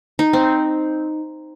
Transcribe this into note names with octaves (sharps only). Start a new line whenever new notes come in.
D#4
C4